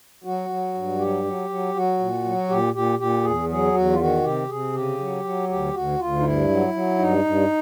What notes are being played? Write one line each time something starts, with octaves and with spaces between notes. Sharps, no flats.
F#3 F#4
F#3
G2
F#3 G4
F#3
F#3
F#3 F#4
A#2
F#3
A#2 G4
A#2 G4
A#2 G4
E2 G#4
F#3 G#4
E2 F#4
F4
D#3 F#4
C3 G4
C3 G#4
C#3 G4
F#3
F#3
D2 G4
D2 F#4
D2 F4
D#4
G2 E4
F#3
F#3
G2 D#4
G2